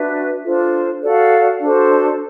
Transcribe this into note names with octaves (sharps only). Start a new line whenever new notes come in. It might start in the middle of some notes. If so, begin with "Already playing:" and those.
Already playing: D4 F#4 B4 E5
D4 F4 A4 C5
F#4 A4 D5 F5
D4 F#4 A4 C5